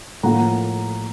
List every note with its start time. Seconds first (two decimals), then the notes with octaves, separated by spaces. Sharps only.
0.23 A2 F3 A#3 F#5 A#5